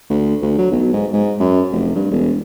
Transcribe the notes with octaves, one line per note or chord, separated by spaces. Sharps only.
D2
D2
F#3
B1
G#2
G#2
F#2
F1
G2
E1